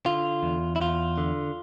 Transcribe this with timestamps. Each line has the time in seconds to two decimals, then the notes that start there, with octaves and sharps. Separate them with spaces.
0.06 D3 F4
0.43 E2
0.76 E4
0.80 E2 F4
1.18 D3